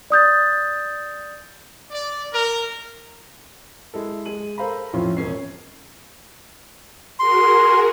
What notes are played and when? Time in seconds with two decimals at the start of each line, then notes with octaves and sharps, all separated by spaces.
0.10 D5 D#6 G6 A6
1.90 D5
2.31 A#4
3.94 G#3 E4 A4
4.25 G#3 G#4 D#7 F#7
4.58 A4 A#4 C5 F5 A#5 B5
4.93 F2 A2 F3 C4 C#4 F4
5.17 E1 C#4 C7
7.19 F#4 G#4 A#4 C6